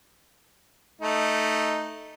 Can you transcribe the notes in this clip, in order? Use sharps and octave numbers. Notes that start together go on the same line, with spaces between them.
A3 D#4